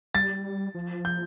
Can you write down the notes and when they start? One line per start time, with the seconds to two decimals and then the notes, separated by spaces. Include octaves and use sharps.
0.15 G3 A6
0.74 F3
1.05 G6